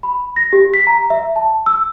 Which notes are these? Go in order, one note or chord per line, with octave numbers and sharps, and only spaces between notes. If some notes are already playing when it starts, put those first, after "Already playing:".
B5
A#6
G4
B6
A#5
E5
A5
E6